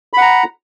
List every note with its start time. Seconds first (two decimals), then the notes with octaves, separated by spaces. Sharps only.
0.13 B5
0.17 F#5
0.21 A#5